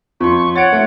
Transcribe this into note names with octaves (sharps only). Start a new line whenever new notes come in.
F2 F4 C6 C#6
C#5 F#5 A6 D7
A3